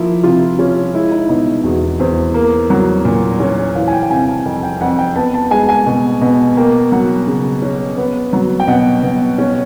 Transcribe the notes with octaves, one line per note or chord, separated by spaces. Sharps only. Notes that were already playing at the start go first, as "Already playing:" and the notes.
Already playing: F3 A#3 E4
C3 F4
C#4 F4
G#3 E4
D#4
B2 D#4
E2 F#4
E2 C5
A#3
F#3
A#2
C#4
E3 F5
G#5
G5
G5
C3 G#5
A5
F2 G#5
G5
F2 F#5
G5
B3 A5
A5
G#3 G#5
G#5
B2
B2
A#3 G5
F#3 F#5
C#3
C#4
B3
F#3
G5
B2 F#5
B2
C#4